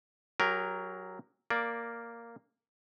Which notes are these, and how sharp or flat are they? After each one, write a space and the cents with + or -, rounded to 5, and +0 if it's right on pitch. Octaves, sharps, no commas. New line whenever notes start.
F#3 +5 G4 +45 A#4 +0
A#3 -5 D5 +0